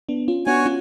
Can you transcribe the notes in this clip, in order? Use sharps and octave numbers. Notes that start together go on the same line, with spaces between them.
B3 D4
C#4 F4
B3 D4 F#4 C#5 G#5
C#4 F4